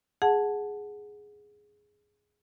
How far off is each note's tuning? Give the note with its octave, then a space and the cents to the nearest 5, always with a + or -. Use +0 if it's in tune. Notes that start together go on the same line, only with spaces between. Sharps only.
G#4 +0 F#5 -10 A5 -10